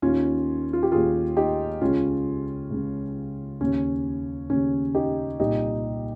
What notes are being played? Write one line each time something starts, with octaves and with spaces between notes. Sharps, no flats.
D#2 D#3 C#4 F4
F4
G4
D#2 D#3 F4 G#4
D#4 G4
C#2 C#3 C#4 F4
C#2 C#3
D#2 C#3 C#4
D#2 C#3 C#4
D#4 G4
C2 A#2 D#4 G4